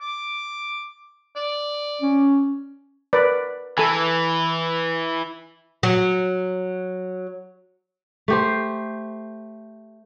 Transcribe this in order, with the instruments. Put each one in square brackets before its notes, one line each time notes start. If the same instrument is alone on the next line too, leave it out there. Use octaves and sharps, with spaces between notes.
[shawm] D6
D5
[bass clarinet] C#4
[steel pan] A#4 B4 D5
[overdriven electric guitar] E3 [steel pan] A4 G#5
[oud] F#3
[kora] A3 G4 C5